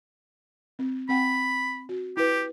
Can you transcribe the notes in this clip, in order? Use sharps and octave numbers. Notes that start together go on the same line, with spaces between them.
C4
C4 F#5 G5 B5
F#4
E4 G4 B4